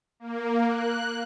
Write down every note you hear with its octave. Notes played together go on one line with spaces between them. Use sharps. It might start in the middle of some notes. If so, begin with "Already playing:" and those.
A#3
F#6